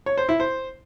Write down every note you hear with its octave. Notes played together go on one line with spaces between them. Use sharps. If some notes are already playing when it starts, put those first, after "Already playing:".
C#5
C5
E4
C5